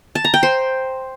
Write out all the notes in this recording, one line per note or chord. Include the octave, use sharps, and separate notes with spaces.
A5
A#5
G5
C5